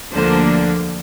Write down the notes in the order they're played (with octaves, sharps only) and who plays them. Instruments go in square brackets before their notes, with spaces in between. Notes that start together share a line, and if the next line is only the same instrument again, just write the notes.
[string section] D2 D3 F3 A#3 D4 C5